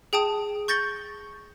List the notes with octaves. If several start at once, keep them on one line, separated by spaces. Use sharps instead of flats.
G#4 G5 A5 D#6
C#6 G6 A6 A#6 C#7 G7